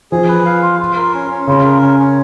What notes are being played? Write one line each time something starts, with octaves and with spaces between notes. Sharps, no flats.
F3 G#4
B4
F5
F4
F4
A#4
C#4
C#4
C#3 F4
A#4
C#4
C#4